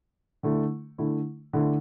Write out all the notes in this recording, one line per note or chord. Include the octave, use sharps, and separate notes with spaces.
D3 A3 E4
D3 A3 E4
D3 A3 E4